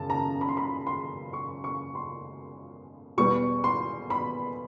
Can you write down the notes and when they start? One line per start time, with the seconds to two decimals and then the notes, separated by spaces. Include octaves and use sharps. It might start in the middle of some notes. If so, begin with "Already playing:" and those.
Already playing: F#2 C#3 A5
0.10 A#5
0.41 B5
0.49 C6
0.57 B5
0.87 C6
1.33 C#6
1.64 C#6
1.95 C6
3.17 E2 B2 G3 B3 C#6
3.64 C6
4.10 B5